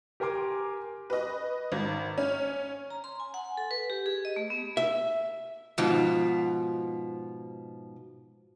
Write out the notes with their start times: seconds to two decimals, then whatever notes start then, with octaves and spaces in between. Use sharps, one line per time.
0.20 G4 A#4 G#5 C6 D6
1.10 B4 D#5
1.72 G#1
2.18 C#4
2.90 A#5
3.04 C6
3.20 G#5
3.34 F#5
3.57 A4
3.71 B4
3.90 G4
4.06 G#4
4.25 D#5
4.36 A3
4.50 B3
4.77 E5
5.78 G#2 B2 F3